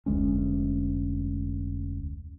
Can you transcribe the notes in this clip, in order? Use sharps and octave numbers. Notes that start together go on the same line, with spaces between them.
F1 D2 G#3 C#4